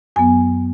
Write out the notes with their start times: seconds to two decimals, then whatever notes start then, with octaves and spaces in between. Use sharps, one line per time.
0.16 F#2 F#3 B3 G#5